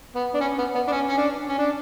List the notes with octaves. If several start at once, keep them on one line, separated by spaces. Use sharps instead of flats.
B3
D4
C#4
B3
B3
D4
C#4
C#4
D4
C#4
D4